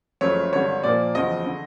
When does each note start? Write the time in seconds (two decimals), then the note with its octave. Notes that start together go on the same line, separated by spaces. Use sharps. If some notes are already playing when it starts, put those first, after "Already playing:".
0.21 F#1 F#2 C#3 F3 A3 C#5
0.53 G#1 G2 D3 G3 C#5
0.83 A#2 F3 A#3 D5
1.15 F#1 E2 C#3 F3 D#5
1.46 D3